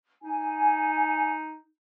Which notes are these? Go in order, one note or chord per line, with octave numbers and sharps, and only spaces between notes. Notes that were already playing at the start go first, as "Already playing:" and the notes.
D#4 G#5